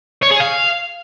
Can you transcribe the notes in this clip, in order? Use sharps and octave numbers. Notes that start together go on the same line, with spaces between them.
C#5
G#4
F5